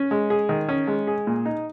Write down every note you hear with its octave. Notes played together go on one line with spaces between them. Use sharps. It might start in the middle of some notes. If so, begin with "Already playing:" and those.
Already playing: C#4
G#3
G#4
D#3
C#4
G#3
G#4
A#2
D#4